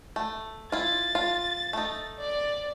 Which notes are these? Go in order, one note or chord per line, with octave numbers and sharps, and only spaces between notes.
A3
E4 F4 A6
F4
A3 D#4
D5